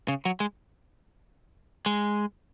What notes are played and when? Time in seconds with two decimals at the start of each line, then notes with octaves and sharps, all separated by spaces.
0.08 C#3
0.25 F#3
0.40 G#3
1.86 G#3